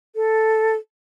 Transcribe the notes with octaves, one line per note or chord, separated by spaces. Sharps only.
A4